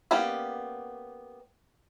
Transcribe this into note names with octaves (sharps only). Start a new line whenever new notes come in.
A#3 B3 C#4 G4 D5